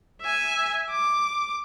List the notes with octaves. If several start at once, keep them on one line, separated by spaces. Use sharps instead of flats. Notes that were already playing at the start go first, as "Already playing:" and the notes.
E5 G#5
D6